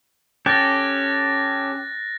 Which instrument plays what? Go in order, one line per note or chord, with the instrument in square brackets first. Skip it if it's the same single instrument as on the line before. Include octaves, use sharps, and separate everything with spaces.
[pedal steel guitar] C#4 G4 A4 [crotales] F#6 A6 A#6